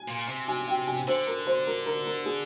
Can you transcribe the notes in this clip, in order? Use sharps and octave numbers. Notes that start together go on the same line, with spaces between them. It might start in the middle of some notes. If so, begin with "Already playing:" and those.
Already playing: G#5
A#2
C3
G#5
G5
G#5
D3 C5
A#4
C5
A#4
A#4
A#4
G#4